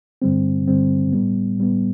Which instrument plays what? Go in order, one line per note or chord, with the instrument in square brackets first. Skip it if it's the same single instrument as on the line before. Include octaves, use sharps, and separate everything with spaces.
[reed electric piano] G2 D3 G3 C4
G2 D3 G3 C4
A2 G3 B3
A2 G3 B3